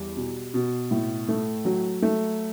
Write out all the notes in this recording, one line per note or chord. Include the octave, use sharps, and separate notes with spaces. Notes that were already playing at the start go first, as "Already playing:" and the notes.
Already playing: E2 G3
B2
B2
A2
A3
F#3
A3